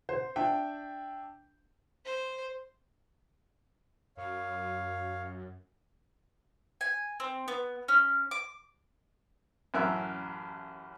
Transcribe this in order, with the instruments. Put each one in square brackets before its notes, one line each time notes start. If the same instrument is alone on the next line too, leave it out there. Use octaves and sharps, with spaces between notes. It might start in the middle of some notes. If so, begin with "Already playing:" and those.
[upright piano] C5
D4 E5 G5
[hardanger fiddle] C5
[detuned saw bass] F#2 [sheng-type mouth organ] C#5 F5
[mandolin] G#5
C4
B3
C#4
D6
[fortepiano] A1 F#2 A#4 E5 F#6